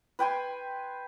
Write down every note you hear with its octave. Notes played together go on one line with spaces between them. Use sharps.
B4 G5 G#5 C6